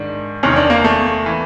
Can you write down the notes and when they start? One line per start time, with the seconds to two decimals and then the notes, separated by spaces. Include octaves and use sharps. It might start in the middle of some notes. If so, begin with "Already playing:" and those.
Already playing: G#2 D#3 D4
0.43 E2 C3 D#3 C#4
0.56 D4
0.70 A#3
0.84 A3
1.26 E3